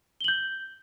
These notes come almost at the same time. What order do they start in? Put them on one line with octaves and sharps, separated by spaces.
G7 F#7 G6